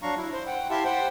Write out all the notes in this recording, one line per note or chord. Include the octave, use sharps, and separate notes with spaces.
F#3 D4 F5 A#5 C#6
E4
C5
F#5 G5
E4 G4 E5 F5 A5 C6
C5 F#5 G5